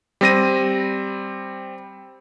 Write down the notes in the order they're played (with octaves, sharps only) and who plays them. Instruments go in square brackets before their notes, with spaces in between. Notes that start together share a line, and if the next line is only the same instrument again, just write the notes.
[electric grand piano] G3 C4 A#6 D#7